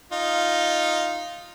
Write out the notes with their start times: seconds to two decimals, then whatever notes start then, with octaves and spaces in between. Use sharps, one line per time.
0.12 D#4 F4